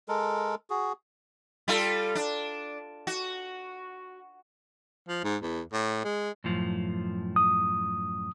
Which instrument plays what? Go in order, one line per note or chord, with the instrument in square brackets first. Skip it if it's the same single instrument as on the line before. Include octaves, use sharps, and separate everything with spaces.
[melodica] G#3 A4 A#4
F#4 G#4
[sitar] G3 F4 A4
D4
F#4
[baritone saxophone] F3
G#2
E2
A2
G#3
[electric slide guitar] F#2 A2 F3
[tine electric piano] D#6